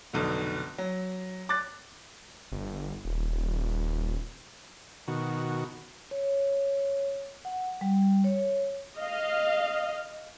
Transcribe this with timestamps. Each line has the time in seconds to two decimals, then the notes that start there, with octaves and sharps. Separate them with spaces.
0.13 F1 B1 B2 D3
0.78 F#3
1.49 D6 F#6 A6
2.52 G1
3.05 D#1
5.08 B2 D#3 F#4
6.11 C#5
7.45 F#5
7.81 G3
8.24 C#5
8.97 D#5 F5